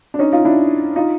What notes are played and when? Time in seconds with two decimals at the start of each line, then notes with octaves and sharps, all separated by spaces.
0.14 D4
0.19 C#4 D#4
0.32 D#4 F4
0.45 D4 E4
0.96 D#4 F4